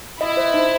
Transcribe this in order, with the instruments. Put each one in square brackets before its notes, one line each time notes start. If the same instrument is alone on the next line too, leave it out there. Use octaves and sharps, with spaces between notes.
[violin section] E4 [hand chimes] D#5
[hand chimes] C5
D#4